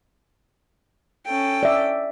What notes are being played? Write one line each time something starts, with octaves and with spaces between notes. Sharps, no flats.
C#4 A4 G5
D5 E5